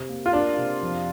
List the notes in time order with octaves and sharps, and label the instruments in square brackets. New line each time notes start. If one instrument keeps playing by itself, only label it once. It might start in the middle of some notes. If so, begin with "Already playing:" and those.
Already playing: [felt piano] C3 G4
A#3
[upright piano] F4
[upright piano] D4 [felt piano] A#4
[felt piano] C3
F2